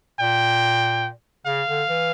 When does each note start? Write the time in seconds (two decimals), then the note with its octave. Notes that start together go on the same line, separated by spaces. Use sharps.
0.20 A#2 G5
1.47 C#3 F5
1.68 D3
1.89 E3